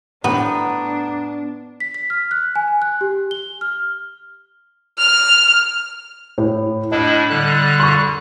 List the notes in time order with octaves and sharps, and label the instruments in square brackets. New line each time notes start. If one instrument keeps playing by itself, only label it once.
[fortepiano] A2 G4 [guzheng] B3 [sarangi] D4 [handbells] F#5 A#5
[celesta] B6
B6
F6
F#6
G#5
F#6
G4
G7
F6
[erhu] F6
[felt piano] A2
[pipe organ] A2 D4 E4 [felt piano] D#5
[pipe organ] D3 G3 F#6
[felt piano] C6 C#6